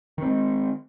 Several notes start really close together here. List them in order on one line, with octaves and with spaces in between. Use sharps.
D#3 C4 G#3